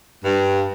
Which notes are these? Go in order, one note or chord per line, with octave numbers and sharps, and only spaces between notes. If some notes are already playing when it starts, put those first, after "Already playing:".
G2